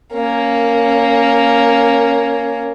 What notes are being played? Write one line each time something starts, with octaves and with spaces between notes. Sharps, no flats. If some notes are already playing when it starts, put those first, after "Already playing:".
A#3 C#4